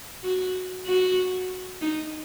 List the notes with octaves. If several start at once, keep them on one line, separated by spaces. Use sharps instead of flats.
F#4
F#4
D#4